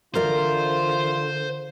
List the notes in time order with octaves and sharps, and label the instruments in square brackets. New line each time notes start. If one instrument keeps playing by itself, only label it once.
[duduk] D3 [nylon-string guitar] E3 A#4 D5 [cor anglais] F4 [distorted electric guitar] C5